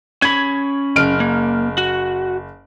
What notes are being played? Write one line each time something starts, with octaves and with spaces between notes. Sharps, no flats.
C#4 B5 G#6
F#1 F6 D7
A#3
F#4